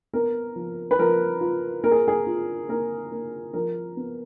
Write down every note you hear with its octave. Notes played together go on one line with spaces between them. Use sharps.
B3 A#4
F3
B4
F3 A#4
F4
A#3 A#4
G#4
G#4
F4
A#3 A#4
A#3
F3 A#4
B3